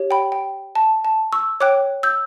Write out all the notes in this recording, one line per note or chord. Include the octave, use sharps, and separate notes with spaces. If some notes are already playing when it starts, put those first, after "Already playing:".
Already playing: G4 C#5
G5 B5
G5
A5
A5
C#6 E6
C#5 G5 D6 F#6
E6 G6